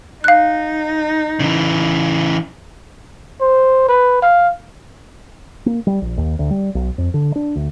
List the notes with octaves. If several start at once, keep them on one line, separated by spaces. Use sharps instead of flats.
D#4 F5 F#6
C#3 E3
C5
B4
F5
A#3
G3
A#1
D#2
D2
G3
B1
F2
D3
D4
D2